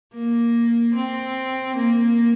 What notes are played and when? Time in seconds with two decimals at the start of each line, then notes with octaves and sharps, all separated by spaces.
0.14 A#3
0.95 C4
1.76 A#3